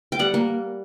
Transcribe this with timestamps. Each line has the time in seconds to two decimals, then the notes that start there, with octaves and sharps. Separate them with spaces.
0.12 G5
0.19 G3 F#5
0.34 A#3